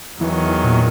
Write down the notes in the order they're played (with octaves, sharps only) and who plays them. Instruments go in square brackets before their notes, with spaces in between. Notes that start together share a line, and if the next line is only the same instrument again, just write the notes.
[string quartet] E2 D#3 F#3 [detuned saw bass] E3
[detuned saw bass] A#2